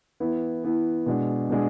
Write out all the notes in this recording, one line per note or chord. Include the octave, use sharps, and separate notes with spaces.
E3 B3 E4
E3 B3 E4
B2 G#3 D4
B2 G#3 D4